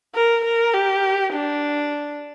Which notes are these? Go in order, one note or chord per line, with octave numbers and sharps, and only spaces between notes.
A#4
A#4
G4
D4